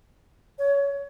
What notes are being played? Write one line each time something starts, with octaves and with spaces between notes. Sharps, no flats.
C#5